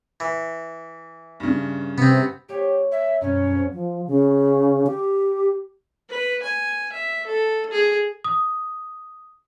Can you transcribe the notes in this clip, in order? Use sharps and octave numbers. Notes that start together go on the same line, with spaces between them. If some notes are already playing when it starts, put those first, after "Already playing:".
E3
G2 C#3
C3 B3 C4
A#3 G4 C#5
E5
F#2 B2 G3 C#4
F2
F3
C#3
G4
B4
G#5
E5
A4
G#4
D#6